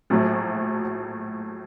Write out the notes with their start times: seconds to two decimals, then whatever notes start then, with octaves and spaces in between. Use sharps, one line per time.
0.10 A#1 A2 F#3 A3